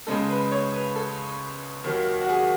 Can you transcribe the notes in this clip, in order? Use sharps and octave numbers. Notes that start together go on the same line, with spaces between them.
C#2 C#3 G#3 A4
B4
C#5
B4
A4
D#2 D#3 F#3
F#4
G#4